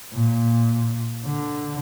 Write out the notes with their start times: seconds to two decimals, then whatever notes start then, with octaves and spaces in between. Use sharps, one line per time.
0.13 A#2
1.26 D3